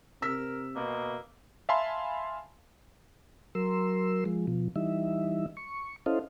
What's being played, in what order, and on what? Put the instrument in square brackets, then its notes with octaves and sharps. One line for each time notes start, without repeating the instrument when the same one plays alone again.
[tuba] C3 [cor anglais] A#4 [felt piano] E6 B6
[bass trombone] B2 [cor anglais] A#3
[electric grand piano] E5 F5 G#5 A5 B5 C6
[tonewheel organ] F#3 A#4 C6 E6
F3 G#3
B2 F3
E3 G3 D#4 E5
C#6
C#4 E4 A4 C5 D#5 F5